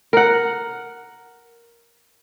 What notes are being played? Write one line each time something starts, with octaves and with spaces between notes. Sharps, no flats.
A#4 F#5